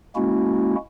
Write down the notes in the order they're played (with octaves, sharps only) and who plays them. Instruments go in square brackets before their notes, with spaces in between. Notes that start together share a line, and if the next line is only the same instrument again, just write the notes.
[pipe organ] G#3 A#3 C#4 E4 F#4